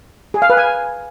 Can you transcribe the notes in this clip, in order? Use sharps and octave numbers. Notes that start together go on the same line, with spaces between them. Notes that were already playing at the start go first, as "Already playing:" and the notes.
G#4
F5
B4
G#5